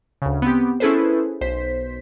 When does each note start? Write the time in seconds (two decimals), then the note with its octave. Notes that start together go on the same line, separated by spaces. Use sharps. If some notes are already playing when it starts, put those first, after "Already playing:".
0.22 D2 C#3
0.42 B3 C4 G4
0.80 C#4 E4 G#4 A4 B4 C5
1.41 B1 C5 B6